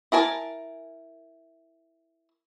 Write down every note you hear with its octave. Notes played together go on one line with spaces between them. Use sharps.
E4 A#4 G#5 A5